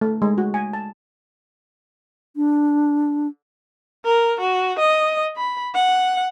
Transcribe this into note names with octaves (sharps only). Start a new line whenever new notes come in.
A3
G#3
F#4
G#5
A5
D4
A#4
F#4
D#5
B5
F#5